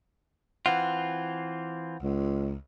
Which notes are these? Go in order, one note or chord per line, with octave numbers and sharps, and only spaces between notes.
E3 C4 F4 F#5
C#2